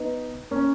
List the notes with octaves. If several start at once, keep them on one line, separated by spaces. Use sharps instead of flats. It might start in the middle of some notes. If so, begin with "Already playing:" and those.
Already playing: B3 D#4
A#3 C#4